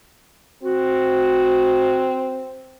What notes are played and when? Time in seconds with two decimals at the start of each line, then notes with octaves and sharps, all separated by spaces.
0.63 C4 F#4